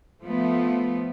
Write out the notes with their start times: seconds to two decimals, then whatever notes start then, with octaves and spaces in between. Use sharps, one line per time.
0.22 F3 A3 B3